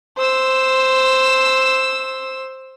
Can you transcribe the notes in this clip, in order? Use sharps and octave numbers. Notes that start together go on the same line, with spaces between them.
C5 E6